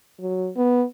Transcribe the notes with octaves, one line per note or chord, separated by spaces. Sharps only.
F#3
B3